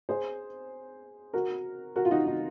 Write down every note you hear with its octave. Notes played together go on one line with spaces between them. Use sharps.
G#4 C5
F#4 A#4
F#4 A#4
F4
D#4 F#4
D#4